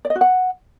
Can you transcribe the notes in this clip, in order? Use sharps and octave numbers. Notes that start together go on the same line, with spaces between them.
D5
D#5
F#4
F#5